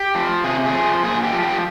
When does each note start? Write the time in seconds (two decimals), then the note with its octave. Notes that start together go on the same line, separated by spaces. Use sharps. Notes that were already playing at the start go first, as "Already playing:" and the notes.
Already playing: G4
0.14 F3
0.44 C3 G#4
0.66 G#4
0.73 F3
1.03 A#2 G#4
1.23 G4
1.33 F3
1.42 G4